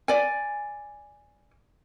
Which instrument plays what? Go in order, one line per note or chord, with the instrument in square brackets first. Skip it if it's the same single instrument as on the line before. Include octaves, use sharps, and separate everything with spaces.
[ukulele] D5 G#5